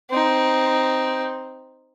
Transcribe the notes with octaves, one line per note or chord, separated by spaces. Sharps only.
C4 D#4